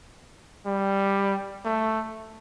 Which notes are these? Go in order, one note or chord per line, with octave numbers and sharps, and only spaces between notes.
G3
A3